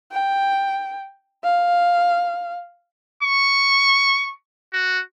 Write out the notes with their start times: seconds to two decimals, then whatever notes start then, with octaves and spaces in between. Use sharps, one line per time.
0.11 G5
1.44 F5
3.23 C#6
4.73 F#4